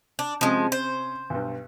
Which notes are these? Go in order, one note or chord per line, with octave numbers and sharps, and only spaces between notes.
D4
C3 F3 G#3 C4 C#4
C5
B1 G2